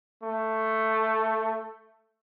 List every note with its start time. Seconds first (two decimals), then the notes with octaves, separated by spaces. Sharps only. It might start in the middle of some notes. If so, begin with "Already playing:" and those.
0.23 A3